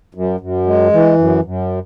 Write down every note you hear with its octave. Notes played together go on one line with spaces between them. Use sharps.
F#2
F#2
G#3
E3
F#2
F#2